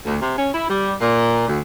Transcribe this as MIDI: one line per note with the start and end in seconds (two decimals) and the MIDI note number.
0.06 0.16 38
0.21 0.37 48
0.37 0.48 61
0.52 0.65 64
0.70 0.93 55
1.01 1.47 46
1.48 1.59 38